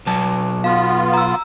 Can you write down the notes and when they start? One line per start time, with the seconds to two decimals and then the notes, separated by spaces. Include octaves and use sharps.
0.07 B2 F#3 A5
0.64 B3 F4 F5
1.14 A#5 E6